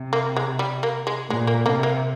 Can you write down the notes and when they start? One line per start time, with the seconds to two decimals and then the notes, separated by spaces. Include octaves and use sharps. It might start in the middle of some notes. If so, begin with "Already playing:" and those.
Already playing: C3
0.13 A#3
0.37 G#3
0.59 G3
0.83 A#3
1.07 G#3
1.30 A#2 G#3
1.47 A#3
1.65 C3 A#3 D4
1.83 A#3